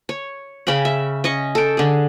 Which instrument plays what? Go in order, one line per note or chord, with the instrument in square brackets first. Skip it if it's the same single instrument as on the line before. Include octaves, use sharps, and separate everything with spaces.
[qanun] C#5
C#3 C#4 G5 B5
E5
C#4 D#5 C#6
A4 G5
D3 G#4